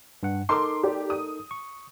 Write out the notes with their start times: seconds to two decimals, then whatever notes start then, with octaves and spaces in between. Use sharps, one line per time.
0.23 G2 F#5
0.49 D#4 A4 A#4 C6 D6
0.83 G4 D5
1.10 D#6
1.51 C#6